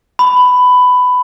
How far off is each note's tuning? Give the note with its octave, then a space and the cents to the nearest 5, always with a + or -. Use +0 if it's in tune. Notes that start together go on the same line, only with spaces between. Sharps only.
B5 +15